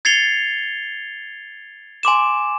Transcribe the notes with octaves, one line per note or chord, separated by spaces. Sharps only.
G#6 A6 C7 C#7 F7 G7
G#5 C6 D6 E7